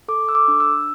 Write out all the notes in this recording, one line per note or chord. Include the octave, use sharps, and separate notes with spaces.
A4 D6
E6
D6
D4
E6